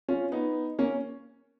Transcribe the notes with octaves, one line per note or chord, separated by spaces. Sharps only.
C#4 F4
B3 D#4
A#3 C#4